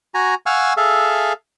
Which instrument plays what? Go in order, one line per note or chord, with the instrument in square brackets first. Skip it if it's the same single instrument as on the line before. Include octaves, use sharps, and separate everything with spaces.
[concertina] F#4 G#5 A#5
F5 F#5 G#5 C#6 E6 F6
G#4 A4 E5 F5